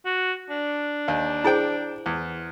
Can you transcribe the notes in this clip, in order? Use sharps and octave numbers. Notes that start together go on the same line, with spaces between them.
F#4
D4
D#2 F5
E4 G#4 C5 G5 A5
E2